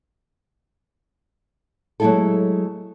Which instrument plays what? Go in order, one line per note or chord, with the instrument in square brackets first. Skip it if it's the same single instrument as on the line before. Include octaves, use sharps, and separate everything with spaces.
[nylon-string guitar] F#3 G#3 A3 E4 G#4 A4